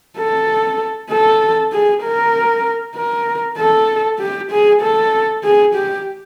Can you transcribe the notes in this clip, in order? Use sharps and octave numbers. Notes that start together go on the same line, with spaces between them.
A4
A4
G#4
A#4
A#4
A4
G4
G#4
A4
G#4
G4